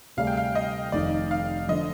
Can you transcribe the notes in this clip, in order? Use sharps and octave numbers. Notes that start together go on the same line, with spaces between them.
D2 C3 G3 D4 G#4 F5
G5
F5
D#5
F1 F2 D#3 D5
F5
D3 F3 D#5